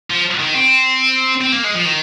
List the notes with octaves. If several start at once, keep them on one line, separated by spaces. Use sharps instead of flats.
F3
D#3
C4
C4
A#3
G#3
F3
D#3